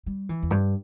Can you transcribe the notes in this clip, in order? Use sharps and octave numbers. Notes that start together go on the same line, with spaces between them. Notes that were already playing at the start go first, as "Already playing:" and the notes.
G3
E3
E2
G2